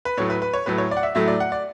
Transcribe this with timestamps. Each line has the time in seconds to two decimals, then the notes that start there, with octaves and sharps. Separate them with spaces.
0.05 B4
0.17 A2 F#3 A3 C#5
0.30 B4
0.42 B4
0.53 C#5
0.66 A2 F#3 A3 B4
0.78 C#5
0.91 D5
0.97 F#5
1.03 E5
1.15 A2 F#3 A3 E5
1.28 D5
1.40 F#5
1.52 D5